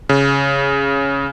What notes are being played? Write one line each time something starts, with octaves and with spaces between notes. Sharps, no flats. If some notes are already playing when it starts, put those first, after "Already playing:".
C#3